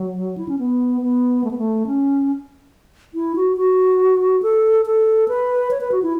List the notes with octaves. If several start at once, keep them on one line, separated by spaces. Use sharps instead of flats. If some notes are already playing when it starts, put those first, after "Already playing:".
Already playing: F#3
E4
C#4
B3
B3
A3
B3
A3
C#4
E4
F#4
F#4
A4
A4
B4
C#5
B4
F#4
E4